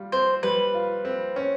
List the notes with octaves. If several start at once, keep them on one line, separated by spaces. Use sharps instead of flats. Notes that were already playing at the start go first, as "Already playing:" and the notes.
Already playing: G3 F4
C4 C5
G3 B4
F4
C4
C#4